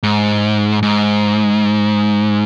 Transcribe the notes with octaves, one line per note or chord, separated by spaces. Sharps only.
G#2
G#2